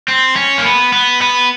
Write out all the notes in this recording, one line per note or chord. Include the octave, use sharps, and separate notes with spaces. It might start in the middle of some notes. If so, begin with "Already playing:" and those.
C4
C#4
A#3
B3
B3
B3